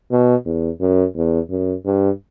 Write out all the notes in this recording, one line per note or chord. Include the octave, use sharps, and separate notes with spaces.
B2
E2
F#2
E2
F#2
G2